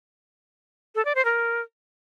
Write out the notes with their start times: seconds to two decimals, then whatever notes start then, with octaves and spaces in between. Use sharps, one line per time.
0.95 A4
1.05 D5
1.15 C5
1.25 A#4